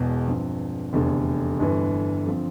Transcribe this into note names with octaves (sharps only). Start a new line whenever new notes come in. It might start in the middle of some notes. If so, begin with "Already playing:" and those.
Already playing: E1 E2 B2
G2 F3 C4
F1 E2 D3
G1 G2 E3
D3 F3 C4